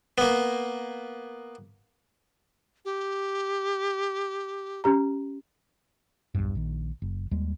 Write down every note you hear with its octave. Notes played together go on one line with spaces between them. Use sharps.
A#3 B3
G4
C#4 G4 A#5
B1 E2 G2
A#1 D#3
F#1
D#2 G3 G#3